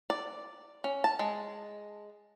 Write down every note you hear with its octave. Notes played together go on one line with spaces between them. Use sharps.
D5
C#4
A5
G#3